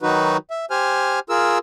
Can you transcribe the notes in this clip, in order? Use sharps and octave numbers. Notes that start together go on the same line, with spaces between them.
D#3 F#3 D#4 F#4 B4
E5
G4 C5 G#5 F6
F4 G#4 A#4 E6